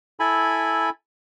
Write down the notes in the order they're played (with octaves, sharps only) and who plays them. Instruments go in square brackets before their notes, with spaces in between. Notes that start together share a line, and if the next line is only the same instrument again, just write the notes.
[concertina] E4 A4 G#5 B5